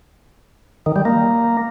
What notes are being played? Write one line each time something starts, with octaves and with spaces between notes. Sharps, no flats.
D#3
G3
A#3